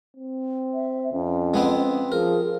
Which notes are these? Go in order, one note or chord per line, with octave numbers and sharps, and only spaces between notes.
C4
E5
F2 C#4
G#3 B3 C4
F3 G#4 A#4